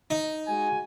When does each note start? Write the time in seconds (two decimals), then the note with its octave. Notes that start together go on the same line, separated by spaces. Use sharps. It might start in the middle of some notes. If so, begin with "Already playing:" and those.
0.10 D#4
0.48 G#3 F#4 G#5